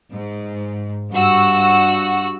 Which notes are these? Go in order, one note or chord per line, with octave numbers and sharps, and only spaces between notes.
G#2
G2 F#4 E6